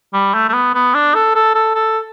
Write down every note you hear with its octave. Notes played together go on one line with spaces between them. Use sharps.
G3
A3
A3
B3
B3
D4
A4
A4
A4
A4